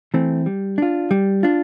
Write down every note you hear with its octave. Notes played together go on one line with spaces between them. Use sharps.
E3 A3 C4
G3
D4 F4
G3
D4 F4